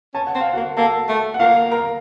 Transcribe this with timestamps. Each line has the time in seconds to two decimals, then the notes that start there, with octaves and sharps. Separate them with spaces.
0.14 C#4 A5
0.27 F#5
0.35 C4
0.41 F5
0.53 F#4 F#5
0.56 A#3
0.77 A#3 A4 A5
1.08 A3
1.34 F#5
1.40 A#3 F4 F5
1.71 A#4 A#5